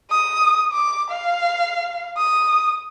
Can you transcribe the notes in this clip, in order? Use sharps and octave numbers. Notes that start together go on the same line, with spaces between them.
D#6
D6
F5
D#6